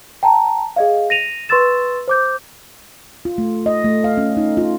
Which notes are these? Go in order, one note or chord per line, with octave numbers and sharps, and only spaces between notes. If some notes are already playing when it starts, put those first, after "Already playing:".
G5 A5 A#5
G#4 D#5 F5
A#6 D#7 F7
B4 C6 C#6 E6 A6 E7
C5 D6 G6
F4
A3
D#5
A3
F5
C#4
D#4
F4